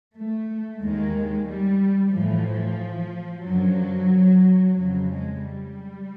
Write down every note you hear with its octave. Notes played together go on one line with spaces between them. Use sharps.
A3
D#2 D#3 G#3
G3
A2 E3 F3
F#2 D3 F3 F#3
F2 C#3 F3 F#3
G#3
G3